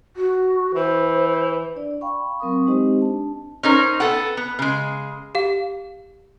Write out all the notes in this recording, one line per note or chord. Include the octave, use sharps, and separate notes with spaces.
F#4
E3 C5
D4 D5
F5 G5 B5 C#6
F#3 C4 A#4 C#6 D#6
G#3 C4 D#4 G4 C5 D#5
D4 A5
C#4 D#4 A#4 C5
B3 A4 F#5
B3
C#3 G#3
G4 F5